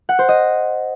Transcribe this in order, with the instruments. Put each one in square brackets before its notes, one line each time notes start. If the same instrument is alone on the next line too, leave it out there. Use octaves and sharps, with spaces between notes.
[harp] F#5
C5
D#5